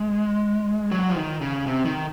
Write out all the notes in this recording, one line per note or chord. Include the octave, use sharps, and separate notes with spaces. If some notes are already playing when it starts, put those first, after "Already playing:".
Already playing: G#3
F#3
F3
D#3
C#3
C3
D#3